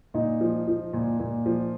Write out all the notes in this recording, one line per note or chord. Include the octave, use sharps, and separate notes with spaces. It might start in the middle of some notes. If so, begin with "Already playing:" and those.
A#2 D#4
F3
F3
A#2
A#2
F3